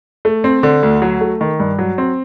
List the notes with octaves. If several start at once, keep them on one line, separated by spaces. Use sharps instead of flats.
A3
C4
D3
D2
F#3
A3
D#3
G2
F#3
C4